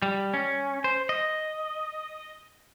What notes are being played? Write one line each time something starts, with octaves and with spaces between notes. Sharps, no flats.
G3
C#4
C5
D#5